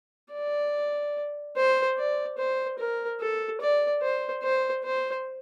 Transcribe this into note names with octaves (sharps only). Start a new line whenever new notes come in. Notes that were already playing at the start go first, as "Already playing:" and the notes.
D5
C5
D5
C5
A#4
A4
D5
C5
C5
C5